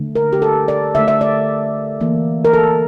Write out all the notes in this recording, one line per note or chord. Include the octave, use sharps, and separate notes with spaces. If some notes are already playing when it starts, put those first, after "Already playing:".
Already playing: D3 A3
A#4
G4
A4
D5
D3 A3 E5
E5
D5
E3 A#3
A#4
A4